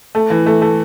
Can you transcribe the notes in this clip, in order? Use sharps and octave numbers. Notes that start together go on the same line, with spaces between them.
A3
E3
A3
A3